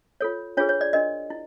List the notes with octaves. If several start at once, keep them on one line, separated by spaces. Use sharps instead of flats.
F4 A4 C#5
D4 F4 G#4 B4 C#5
C#5
D5
D4 F#4 A#4 D#5
E4